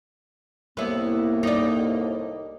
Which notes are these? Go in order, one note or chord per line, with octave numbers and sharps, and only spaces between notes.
C2 A2 A#3 B3 E4
D#4 D5